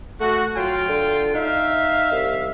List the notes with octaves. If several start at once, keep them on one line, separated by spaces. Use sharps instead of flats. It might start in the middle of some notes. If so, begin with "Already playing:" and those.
A3 F#4
F#3 F4 F5 G5
D3
D#4 E5 F5
C2